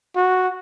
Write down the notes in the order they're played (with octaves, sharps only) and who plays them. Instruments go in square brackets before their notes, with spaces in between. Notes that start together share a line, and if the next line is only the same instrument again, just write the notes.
[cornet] F#4